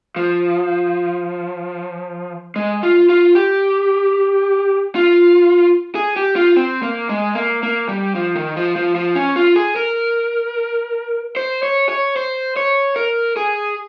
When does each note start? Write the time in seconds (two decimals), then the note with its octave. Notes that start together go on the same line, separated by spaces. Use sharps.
0.16 F3
2.56 G#3
2.83 F4
3.09 F4
3.35 G4
4.95 F4
5.95 G#4
6.16 G4
6.36 F4
6.56 C4
6.83 A#3
7.09 G#3
7.35 A#3
7.63 A#3
7.89 G3
8.15 F3
8.36 D#3
8.56 F3
8.76 F3
8.95 F3
9.15 C#4
9.36 F4
9.56 G#4
9.76 A#4
11.36 C5
11.63 C#5
11.89 C#5
12.16 C5
12.56 C#5
12.96 A#4
13.36 G#4